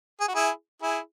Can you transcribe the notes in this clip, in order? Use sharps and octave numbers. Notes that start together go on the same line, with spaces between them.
G#4
F#4
E4 G#4
E4 G#4